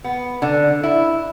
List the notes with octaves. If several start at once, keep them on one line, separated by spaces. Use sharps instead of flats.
B3
D3
E4